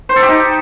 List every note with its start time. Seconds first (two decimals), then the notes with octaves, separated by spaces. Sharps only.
0.09 C5
0.16 A4
0.22 G4
0.29 D#4